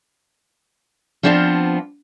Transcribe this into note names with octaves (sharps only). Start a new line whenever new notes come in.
F3 B3 C4 D4 D#4 F4